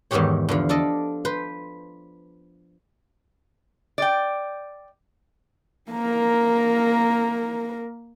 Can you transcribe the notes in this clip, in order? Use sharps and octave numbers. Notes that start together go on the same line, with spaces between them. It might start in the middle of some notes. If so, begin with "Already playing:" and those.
E2 G#2 D#3 E3 G4 C#5
E2 D3 F3
D4 A4 D5 D#5
B4 C5
D5 G5
A#3 A#4